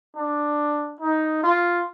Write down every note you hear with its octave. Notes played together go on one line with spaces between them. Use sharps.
D4
D#4
F4